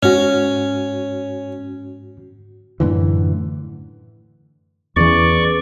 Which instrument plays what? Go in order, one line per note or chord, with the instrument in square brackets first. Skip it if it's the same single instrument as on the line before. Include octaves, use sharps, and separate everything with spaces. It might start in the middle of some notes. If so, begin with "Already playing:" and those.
[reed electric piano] G#2 F#4 [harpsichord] C#4
[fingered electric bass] F#2 A2 D3 E3
[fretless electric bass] E2 E3 [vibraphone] C#4 G#4 B4 [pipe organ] D5 C#6